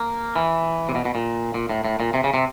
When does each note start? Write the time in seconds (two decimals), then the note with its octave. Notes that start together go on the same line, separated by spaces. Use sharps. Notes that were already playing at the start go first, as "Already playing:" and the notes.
Already playing: A#3
0.36 E3
0.89 C3
0.95 B2
1.05 B2
1.15 A#2
1.54 A#2
1.69 A2
1.85 A2
2.00 A#2
2.14 C3
2.24 C#3
2.34 C3